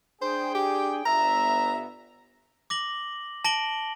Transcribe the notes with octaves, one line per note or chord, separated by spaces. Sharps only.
D4 G#4 C5 G5
G4
G1 B3 E5 A#5
D6 A#6 F#7 G7
A5 A#6 D7 F#7 G7